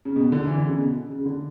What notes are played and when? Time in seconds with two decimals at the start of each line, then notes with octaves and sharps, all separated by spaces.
0.05 C#3
0.16 B2
0.32 D3
0.47 E3
0.58 D3
0.68 C#3
0.78 B2
1.09 C#3
1.26 D3